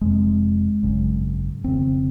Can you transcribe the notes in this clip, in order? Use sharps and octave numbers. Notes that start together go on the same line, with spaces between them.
F1 F2 C3 G#3
G#1 F#2 C#3
F1 D#2 C#3 C4